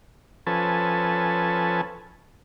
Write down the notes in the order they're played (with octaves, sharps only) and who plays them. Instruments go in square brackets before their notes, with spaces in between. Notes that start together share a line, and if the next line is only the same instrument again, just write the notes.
[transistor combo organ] F3 C#4 A4 B4 G#5 A5